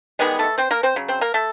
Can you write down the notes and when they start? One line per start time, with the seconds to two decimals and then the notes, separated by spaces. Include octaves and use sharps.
0.19 D#3 G3 G#3 B3 G#4
0.39 A3 A4
0.58 C4 C5
0.71 A#3 A#4
0.83 C4 C5
0.96 C#3 F#3
1.08 C4 C5
1.21 A#3 A#4
1.34 A3 A4